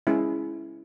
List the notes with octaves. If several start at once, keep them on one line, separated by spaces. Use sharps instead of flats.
G#3 C#4 E4 G#4